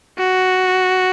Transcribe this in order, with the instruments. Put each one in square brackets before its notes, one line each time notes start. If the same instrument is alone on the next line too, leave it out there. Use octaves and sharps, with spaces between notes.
[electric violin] F#4